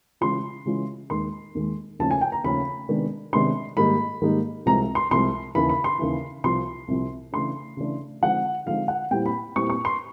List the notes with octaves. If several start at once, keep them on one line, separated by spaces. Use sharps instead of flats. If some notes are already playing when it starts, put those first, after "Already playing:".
C#3 E3 G#3 C#4 F4 C6
C#3 E3 G#3 C#4 F4
D#2 D#3 G#3 C6
D#2 D#3 G#3
D#2 C#3 F3 A3 C#4 A5
G#5
G5
A#5
D#2 C#3 F3 A3 C#4 B5
C3 D#3 G#3 B3 D4
C3 D#3 G#3 B3 D4 C6
G#2 D#3 G3 A#3 D#4 B5
G#2 D#3 G3 A#3 D#4
C2 C3 F3 G#3 A#5
C6
C2 C3 F3 G#3 C6
D#2 C#3 E3 B5
B5
C6
D#2 C#3 E3
C2 C3 F3 C6
C2 C3 F3
C#3 E3 A3 D4 C6
C#3 E3 A3 D4
D3 F3 G#3 C4 D#4 F#5
D3 F3 G#3 C4 D#4 F5
F#5
A#2 G3 C4 E4 G5
B5
A#2 G3 C4 E4 C#6
C#6
C6